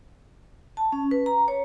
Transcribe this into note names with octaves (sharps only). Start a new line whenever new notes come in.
A5
C#4
B4
A#5
C#5